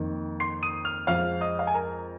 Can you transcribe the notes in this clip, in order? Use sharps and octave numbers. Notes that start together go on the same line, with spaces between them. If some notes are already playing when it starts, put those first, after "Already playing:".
Already playing: F2 D#3 A#3
C6 C7
D#6 D#7
F6 F7
F2 F3 G#3 F5 F6
D#5 D#6
F5
G#5
A#4 A#5